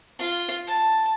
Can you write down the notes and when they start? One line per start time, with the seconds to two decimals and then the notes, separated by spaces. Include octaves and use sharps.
0.19 F4
0.67 A5